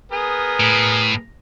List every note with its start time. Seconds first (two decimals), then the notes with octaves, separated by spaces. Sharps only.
0.12 B3 G#4 A#4
0.60 A2